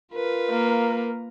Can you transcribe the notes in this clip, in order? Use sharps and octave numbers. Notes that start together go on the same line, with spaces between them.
F4 A#4 B4
A#3